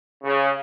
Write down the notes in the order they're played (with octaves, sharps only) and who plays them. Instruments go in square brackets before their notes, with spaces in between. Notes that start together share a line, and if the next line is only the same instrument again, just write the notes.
[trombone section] C#3